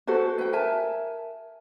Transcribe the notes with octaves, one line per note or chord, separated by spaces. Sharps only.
F#4 A4 B4 C5
B4 G5
A#4 E5 G#5 A5